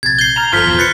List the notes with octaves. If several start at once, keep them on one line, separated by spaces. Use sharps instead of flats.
A#1 C3 G#6 A6
G6 C7 G7
A#5 F6
G1 F4 A4 C5 F6 B6
A#1 E2 B2
B4 F#6 A6 C7 C#7